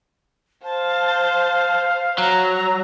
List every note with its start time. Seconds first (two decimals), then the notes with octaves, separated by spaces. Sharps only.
0.64 C5 F5 A5
2.18 F#3 A#5